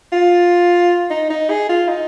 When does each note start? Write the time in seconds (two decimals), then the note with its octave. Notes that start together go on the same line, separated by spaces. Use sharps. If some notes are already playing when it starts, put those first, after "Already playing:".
0.12 F4
1.10 D#4
1.30 D#4
1.50 G#4
1.69 F4
1.88 D#4